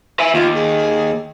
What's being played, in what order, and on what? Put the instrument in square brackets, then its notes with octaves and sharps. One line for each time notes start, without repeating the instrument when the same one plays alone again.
[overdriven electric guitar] E5 G#5
[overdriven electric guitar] D#2 [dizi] F4
[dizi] G#4